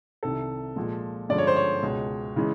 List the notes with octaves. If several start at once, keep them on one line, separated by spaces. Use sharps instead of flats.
C2 C3 D#3 A4
A#2 F3 G#3
G2 D3 F3 G#3 C#4 D5
C#5
C5
C#5
C#2 B2 G#3
C#3 E3 G#3